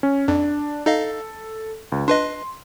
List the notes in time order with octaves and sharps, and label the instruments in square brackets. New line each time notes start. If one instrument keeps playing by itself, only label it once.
[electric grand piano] C#4
[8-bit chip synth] F2 [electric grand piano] D4
[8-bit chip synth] D#4 D#5 F5 [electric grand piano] A4
[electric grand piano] C#2
[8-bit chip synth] D4 B4 D#5 [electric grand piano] C6